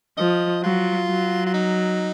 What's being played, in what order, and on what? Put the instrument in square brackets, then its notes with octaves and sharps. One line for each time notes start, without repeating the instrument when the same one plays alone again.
[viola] F3 [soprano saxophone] D#5
[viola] F#3 [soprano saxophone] F4
[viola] F#3
[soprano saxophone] F4
D#4